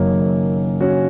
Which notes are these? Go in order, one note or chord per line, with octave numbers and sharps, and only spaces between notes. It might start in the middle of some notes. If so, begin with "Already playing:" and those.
Already playing: F#1 F#2 D#3 F#3 A#3
C#4 F#4